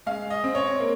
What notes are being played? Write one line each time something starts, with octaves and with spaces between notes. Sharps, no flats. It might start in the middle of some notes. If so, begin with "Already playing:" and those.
G#3 F5
D#5
C4
C#5
A#3